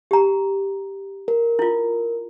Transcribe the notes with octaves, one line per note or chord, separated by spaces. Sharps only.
G4 A#5
A#4
E4 F4